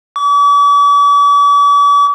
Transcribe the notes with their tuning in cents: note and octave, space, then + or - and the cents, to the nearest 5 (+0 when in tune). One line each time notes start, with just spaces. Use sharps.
D6 -45